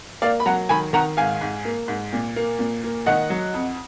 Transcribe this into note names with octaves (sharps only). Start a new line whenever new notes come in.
A#3 D5 F5
B5
F#3 F#5 A#5
D#3 G#5 B5
D#3 F#5 A#5
G#2 F5 G#5
G#2
A#3
G#2
A#2
A#3
A#2
A#3
D#3 D#5 F#5
F#3
F2